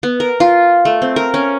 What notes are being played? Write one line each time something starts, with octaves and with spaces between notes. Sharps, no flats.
B3
A#4
F4
A3
C4
A#4
C#4